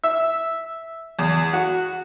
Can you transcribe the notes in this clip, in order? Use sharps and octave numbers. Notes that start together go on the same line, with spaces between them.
E5
E2
F#4